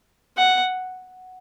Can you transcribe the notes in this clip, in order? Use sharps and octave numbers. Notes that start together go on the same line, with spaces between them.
F#5